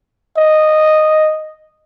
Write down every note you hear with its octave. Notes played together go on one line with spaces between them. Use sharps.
D#5